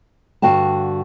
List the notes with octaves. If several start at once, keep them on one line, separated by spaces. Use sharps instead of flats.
G2 D3 F#4 F5 G5 A5